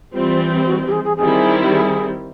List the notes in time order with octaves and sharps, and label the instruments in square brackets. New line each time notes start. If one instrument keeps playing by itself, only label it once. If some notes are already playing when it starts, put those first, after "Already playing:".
[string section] E3 G3 C4 [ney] F4
[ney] F#4
G4
G#4
G#4
[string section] D#3 G3 C4 E4 [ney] G#4
[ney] G#4